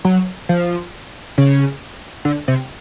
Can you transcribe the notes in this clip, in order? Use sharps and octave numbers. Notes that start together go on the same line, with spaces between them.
F#3
F3
C#3
D3
C3